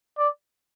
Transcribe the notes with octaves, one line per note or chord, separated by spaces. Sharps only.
D5